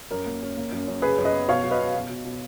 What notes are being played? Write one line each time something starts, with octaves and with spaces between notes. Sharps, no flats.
F#2 A#4
A#3
C#4
A#3
F#2
F#2
C#3 G#4 B4
F#2
B4 D#5
B3
B2 C#5 F5
F#3
B4 D#5
B2
B2
B2
B2